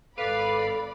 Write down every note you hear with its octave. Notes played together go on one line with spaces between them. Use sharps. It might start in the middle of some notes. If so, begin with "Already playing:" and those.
G#1 A4 B4 D5 F5 B5